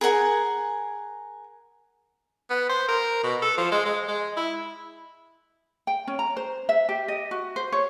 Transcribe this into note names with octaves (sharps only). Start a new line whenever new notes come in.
G#4 A#4 F#5 G#5
B3
C5
A#4
B2
A4
F3
G#3
G#3
G#3
E4
G5
C#4
A#5
C5
E5
G4
D#5
F#4
C5
C#5